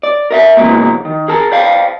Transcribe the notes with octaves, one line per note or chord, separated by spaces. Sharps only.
D5
A#4 D#5 E5
C3 E3 F#3 G#3 A#3 B3
D#3
G#4 A#4 A5
C5 D5 F5 G5 A5